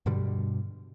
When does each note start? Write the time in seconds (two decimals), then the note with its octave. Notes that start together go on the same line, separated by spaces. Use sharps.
0.06 G2 B2 D3 G3